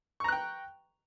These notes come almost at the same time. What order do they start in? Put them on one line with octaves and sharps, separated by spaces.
C#6 A#5 F#6 G5